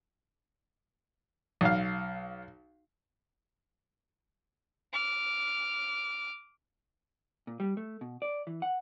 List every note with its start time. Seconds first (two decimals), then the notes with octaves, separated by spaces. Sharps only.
1.61 B1 F5
4.93 D6 F6
7.47 A#2
7.60 G3
7.77 A3
8.01 B2
8.22 D5
8.47 E3
8.62 F#5